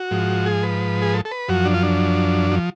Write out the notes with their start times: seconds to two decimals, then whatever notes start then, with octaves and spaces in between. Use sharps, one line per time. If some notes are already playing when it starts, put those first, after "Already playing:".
Already playing: F#4
0.11 G#2 F3
0.46 G#4
0.63 B4
1.02 G#4
1.14 A4
1.25 A4
1.31 B4
1.48 F#2 F3 F#4
1.65 D4
1.74 F4
1.83 D4
2.52 F3